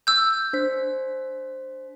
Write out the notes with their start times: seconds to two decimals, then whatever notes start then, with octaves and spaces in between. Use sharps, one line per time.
0.07 E6 G6
0.53 D4 C5 B6